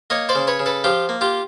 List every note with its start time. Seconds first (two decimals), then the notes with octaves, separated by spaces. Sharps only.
0.10 A#3 C#5 D#5
0.29 C5 D5
0.35 C#3
0.47 B4 C#5
0.59 C#3
0.66 A4 B4
0.84 F3 F4 G4
1.09 A#3
1.21 F4 G4